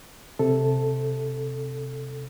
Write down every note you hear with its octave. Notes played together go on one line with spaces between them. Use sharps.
C3 A4